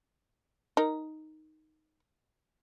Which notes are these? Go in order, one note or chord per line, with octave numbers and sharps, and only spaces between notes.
D#4 A#4